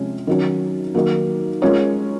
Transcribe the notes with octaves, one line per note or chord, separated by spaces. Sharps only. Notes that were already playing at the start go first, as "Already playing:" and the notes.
Already playing: C3 F3 G#3 C#4
D#3 F#3 C#4
D#3 F#3 A#3
G#3 C#4 F4 A#4 C#5